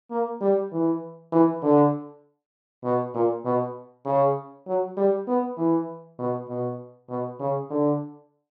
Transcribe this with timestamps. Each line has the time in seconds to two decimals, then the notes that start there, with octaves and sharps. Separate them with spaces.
0.11 A#3
0.41 G3
0.72 E3
1.32 E3
1.63 D3
2.84 B2
3.14 A#2
3.45 B2
4.05 C#3
4.67 F#3
4.97 G3
5.28 B3
5.57 E3
6.19 B2
6.49 B2
7.09 B2
7.40 C#3
7.70 D3